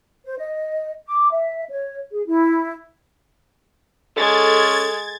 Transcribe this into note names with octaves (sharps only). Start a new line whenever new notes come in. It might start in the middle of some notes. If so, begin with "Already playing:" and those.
C5
D#5
D6
E5
C#5
G#4
E4
G#3 C#4 A4 G#6 A6